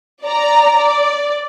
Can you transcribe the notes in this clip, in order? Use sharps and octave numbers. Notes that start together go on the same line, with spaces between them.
D5 A#5
D5